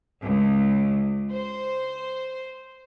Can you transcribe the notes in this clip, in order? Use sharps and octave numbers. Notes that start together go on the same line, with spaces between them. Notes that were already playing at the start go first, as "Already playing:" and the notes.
C#2
C5